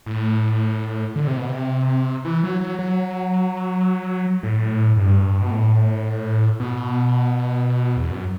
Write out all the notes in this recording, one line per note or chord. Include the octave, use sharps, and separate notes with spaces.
A2
D3
C3
B2
C3
E3
F#3
F#3
F#3
A2
G2
B2
A2
B2
E2
F#2